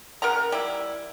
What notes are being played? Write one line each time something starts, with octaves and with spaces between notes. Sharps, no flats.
C#3 A#4 F#5 A#5
G3 E4